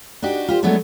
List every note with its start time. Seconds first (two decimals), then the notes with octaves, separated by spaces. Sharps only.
0.22 D4 D#4 F#4 G4
0.48 F4 G4 C5
0.63 F#3 G#3 A3 B3 D4 C#5